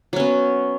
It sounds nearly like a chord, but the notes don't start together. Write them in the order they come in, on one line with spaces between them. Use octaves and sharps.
F#3 C#4 B3